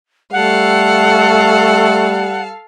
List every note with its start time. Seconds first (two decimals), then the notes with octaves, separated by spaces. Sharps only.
0.32 G3 A3 A4 F5 F#5